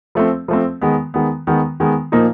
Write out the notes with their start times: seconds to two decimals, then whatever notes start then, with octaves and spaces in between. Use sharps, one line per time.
0.15 F3 A3 C4
0.48 F3 A3 C4
0.81 D#3 G#3 B3
1.14 D#3 G#3 B3
1.47 D#3 G#3 B3
1.80 D#3 G#3 B3
2.12 A#2 F3 A#3 D#4